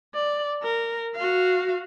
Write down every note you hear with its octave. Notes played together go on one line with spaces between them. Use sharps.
D5
A#4
F#4 F5